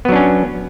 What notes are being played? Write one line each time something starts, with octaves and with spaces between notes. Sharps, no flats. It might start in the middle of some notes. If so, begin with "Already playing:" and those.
F#3 B3 C#4 D4